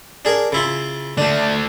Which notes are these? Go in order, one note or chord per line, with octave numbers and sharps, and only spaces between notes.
D4 G#4 A#4
C#3 E4 F4
D3 A3 D4